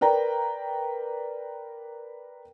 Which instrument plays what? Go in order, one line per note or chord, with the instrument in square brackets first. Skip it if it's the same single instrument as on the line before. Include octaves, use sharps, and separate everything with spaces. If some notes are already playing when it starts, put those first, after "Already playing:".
[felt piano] A#4 B4 D5 G5 A#5